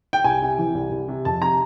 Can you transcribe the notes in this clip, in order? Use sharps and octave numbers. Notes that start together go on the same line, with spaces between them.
G5
C2 G#5
C3
E3
C2
C2
C3
F2 A5
C3 A#5